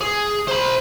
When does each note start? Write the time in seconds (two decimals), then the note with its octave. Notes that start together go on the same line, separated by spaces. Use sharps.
0.01 G#4
0.47 C5 B5